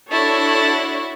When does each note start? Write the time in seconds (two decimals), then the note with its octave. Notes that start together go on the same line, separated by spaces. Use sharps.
0.12 D4 E4 F#4 A4 C#5 A5